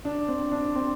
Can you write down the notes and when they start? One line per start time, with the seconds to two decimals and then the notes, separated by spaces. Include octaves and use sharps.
0.05 D4
0.28 C4
0.52 D4
0.75 C4